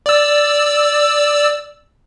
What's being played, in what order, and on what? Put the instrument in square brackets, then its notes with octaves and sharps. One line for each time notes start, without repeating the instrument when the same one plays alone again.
[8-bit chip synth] D5 E6